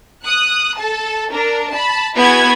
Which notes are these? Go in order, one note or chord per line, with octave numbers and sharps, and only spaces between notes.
D#6 F#6
A4 A5
D4 A#4
A5 B5
B3 E4 F#4 G#4 B5 G#6